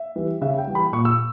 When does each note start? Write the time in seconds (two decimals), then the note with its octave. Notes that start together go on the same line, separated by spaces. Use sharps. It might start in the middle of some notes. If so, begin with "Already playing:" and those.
Already playing: E5
0.16 E3 G3
0.41 C#3 E5
0.58 G5
0.67 E3 G3
0.75 B5
0.92 A#2 C#6
1.05 E6